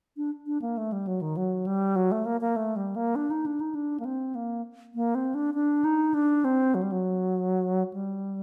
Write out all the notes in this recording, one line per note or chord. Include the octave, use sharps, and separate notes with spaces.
D4
D4
A#3
A3
G3
F#3
D#3
F#3
G3
F#3
A3
A#3
A#3
A3
G3
A#3
D4
D#4
D4
D#4
D4
A#3
C4
A#3
A#3
C4
D4
D4
D#4
D4
C4
F#3
G3
F#3
G3